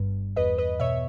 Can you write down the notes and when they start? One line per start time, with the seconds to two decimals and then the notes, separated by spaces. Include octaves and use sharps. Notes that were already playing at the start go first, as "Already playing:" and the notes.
Already playing: G1 G2
0.36 E2 B4 D#5
0.58 B4 D#5
0.80 B2 C#5 E5